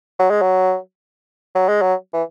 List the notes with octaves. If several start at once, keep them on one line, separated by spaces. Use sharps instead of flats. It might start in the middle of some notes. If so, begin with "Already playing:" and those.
F#3
G#3
F#3
F#3
G#3
F#3
E3